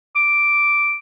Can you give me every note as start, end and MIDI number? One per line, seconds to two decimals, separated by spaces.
0.16 0.99 86